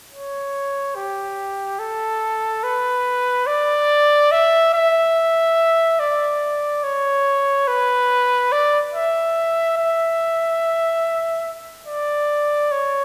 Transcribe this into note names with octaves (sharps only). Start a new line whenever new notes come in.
C#5
G4
A4
B4
D5
E5
E5
D5
C#5
B4
D5
E5
E5
D5
C#5